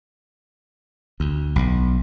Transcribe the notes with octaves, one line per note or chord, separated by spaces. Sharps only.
D2
B1